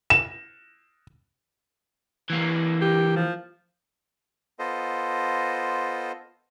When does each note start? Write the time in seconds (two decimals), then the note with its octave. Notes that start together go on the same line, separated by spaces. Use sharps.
0.10 E7
2.30 E3 A#3
2.82 G4
3.16 F3
4.59 B3 F4 A4 C5 D#5